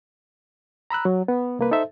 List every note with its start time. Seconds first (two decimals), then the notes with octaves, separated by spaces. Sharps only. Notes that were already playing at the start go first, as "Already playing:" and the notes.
0.90 A#5 B5 E6 F#6
1.05 F#3
1.28 B3
1.59 C2 A#3 B4
1.71 D#4 A4 C5 E5